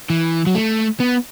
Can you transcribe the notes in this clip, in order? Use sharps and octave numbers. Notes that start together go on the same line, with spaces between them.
E3
F#3
A3
B3